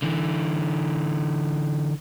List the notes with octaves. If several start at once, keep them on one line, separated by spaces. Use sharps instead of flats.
D3 E3